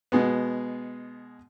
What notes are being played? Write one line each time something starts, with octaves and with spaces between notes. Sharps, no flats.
B2 G#3 B3